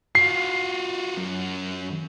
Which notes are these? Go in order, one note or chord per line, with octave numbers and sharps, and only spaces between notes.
F4 F#4 C7
F#2